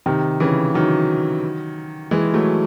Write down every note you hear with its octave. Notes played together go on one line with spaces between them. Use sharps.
C3 D#3
C#3 E3
D#3 F#3
E3 G#3
F#3 A3